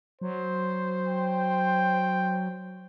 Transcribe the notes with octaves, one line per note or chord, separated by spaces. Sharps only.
F#3 C5
G5